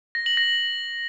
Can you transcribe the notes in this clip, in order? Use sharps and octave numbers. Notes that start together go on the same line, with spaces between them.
A#6
F#7
A#6